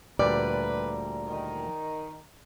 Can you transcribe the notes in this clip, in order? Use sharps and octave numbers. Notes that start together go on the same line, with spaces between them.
D2 A#2 G3 B4 D5 A#5
D#3